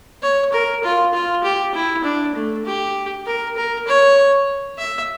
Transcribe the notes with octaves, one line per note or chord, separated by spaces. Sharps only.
C#5
A#4
F4
F4
G4
E4
D4
A3
G4
A#4
A#4
C#5
E5